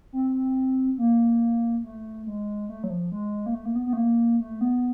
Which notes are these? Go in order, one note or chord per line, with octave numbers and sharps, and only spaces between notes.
C4
A#3
A3
G#3
A3
F#3
F3
G#3
A#3
A3
A#3
B3
B3
A3
A#3
A3
B3